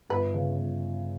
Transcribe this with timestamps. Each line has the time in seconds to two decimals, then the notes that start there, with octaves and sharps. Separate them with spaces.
0.09 G1 B4
0.34 C#3
0.59 G1